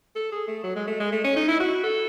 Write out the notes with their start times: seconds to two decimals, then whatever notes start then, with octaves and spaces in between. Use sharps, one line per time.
0.16 A4
0.32 G#4
0.48 A3
0.64 F#3
0.76 G#3
0.87 A3
1.00 G#3
1.12 A3
1.24 C#4
1.36 D#4
1.48 E4
1.60 F#4
1.84 A4